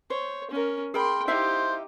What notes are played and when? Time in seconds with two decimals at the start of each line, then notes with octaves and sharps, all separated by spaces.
0.10 C5 C#5
0.51 C#4 A#4
0.94 G#4 A#4 G5 B5 C6
1.28 D#4 E4 G4 C5 E5 F5